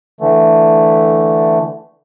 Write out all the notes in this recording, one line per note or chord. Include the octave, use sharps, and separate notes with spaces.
D3 E3 A3